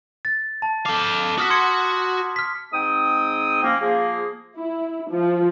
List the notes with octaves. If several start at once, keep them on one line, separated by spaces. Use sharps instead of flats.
A6
A5
A4 F5 D6
F#4 D#6 F6 B6
C6 G#6 C#7
F6 B6
G#2 G#3 C4 G5 D#6
F3 A#3 C#4
F3 A#3 G#4
E4
F3